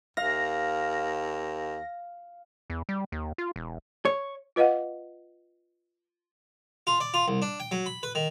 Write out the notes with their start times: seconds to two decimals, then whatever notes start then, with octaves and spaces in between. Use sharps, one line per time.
0.17 D#2 F5 A#6
2.70 E2
2.89 G3
3.12 D#2
3.38 F4
3.56 E1
4.05 C#5
4.56 F4 B4 D#5 F5 F#5
6.87 F4
7.00 D5
7.14 F4
7.28 C2
7.42 D4
7.60 G5
7.71 F#3
7.86 B5
8.03 B4
8.15 D#3